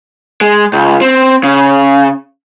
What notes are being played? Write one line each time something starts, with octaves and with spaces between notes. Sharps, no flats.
G#3
C#2
C4
C#3